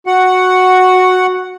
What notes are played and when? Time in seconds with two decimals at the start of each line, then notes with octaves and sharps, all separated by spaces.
0.06 F#4 F#5